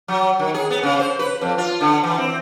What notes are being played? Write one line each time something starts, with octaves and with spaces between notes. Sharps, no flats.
F#3
D#3
G#4
B3
C#3
C5
B4
F2
F4
D3
E3
C4